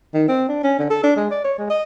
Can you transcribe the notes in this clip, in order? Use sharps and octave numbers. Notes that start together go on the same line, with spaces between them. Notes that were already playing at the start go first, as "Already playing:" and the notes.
D#3
C4
D4
C#4
D3
A4
D4
G#3
D5
C#5
G#3
D#5